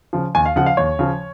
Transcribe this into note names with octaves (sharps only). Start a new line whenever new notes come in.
C#3 F3
D#2 G#5
F5
C#3 F3 F#5
F5
D#2 C#5
C#3 F3